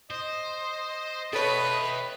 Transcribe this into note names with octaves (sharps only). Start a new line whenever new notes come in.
C5 D#5
A4 B4 C#5 E5 G5